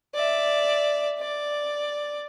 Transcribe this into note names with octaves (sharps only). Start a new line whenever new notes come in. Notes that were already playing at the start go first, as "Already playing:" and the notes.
D5 E5
D5